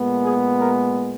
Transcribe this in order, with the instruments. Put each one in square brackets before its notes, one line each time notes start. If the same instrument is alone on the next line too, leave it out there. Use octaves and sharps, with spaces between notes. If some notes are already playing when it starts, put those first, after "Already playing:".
Already playing: [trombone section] A#2 G#3 B3
G#4
A#4